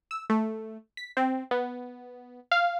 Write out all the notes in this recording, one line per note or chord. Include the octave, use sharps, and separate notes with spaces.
E6
A3
B6
C4
B3
F5